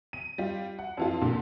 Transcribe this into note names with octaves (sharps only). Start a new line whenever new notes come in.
D#7
G3 F4
F#5
F2 E3 F4
A#2 D3